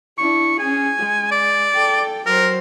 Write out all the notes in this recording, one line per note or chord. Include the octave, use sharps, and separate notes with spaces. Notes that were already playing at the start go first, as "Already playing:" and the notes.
D4 E4 C#6
C#4 G#4 G#5
G#3
D5
A4 G5
F#3 A#4 C5